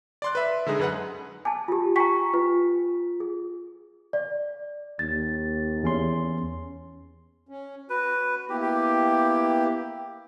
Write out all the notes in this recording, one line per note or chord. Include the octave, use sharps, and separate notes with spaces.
D5 C6 F#6
B4 E5
D3 G#3 D#4 G#4
F#2 B4 F#5
G#5 A5 D6
F4 G4
G5 G#5 A#5 C#6 B6
F4 B4
G#4
D5
D#2 A6
E2 C#4 C6
C#4
F#4 B4
A#3 B3 E4 G4
G4